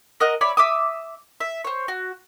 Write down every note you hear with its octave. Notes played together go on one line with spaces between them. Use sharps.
A#4 D#5 F#5
C#5 D5 E5 B5
E5 D6 D#6
E5
C5 C#5
F#4